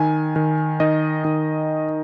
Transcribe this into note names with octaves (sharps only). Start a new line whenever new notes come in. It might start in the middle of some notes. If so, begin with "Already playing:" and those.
Already playing: D#3 G#5
D#3
D#3 D#5
D#3